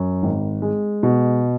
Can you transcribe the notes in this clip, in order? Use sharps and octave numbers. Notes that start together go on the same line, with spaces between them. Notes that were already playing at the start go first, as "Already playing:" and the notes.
Already playing: F#2
G#1
G#3
B2